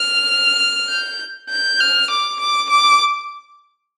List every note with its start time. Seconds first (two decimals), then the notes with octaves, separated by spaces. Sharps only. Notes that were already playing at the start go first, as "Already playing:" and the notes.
Already playing: F6
0.90 G6
1.50 G6
1.80 F6
2.10 D6
2.40 D6
2.69 D6